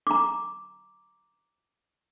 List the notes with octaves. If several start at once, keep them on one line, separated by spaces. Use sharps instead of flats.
A#5 D6